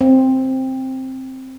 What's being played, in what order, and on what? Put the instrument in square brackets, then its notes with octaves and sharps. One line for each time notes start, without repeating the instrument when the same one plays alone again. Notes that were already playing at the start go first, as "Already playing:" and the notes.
[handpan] C4